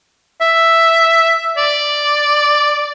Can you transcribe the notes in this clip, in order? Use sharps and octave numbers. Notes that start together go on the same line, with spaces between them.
E5
D5